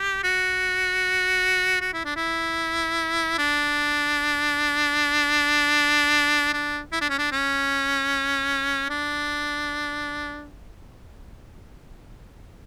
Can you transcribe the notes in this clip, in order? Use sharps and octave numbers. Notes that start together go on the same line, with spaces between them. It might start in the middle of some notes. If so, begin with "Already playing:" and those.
Already playing: G4
F#4
F#4
E4
D4
E4
D4
D4
E4
D4
C#4
D4
C#4
D4